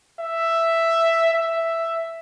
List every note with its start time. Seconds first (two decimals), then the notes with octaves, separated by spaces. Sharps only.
0.20 E5
1.34 E5